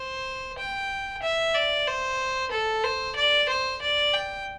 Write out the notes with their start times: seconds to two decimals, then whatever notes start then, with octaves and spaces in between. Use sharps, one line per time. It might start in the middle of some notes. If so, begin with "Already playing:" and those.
Already playing: C5
0.58 G5
1.23 E5
1.55 D5
1.87 C5
2.51 A4
2.84 C5
3.16 D5
3.49 C5
3.81 D5
4.14 G5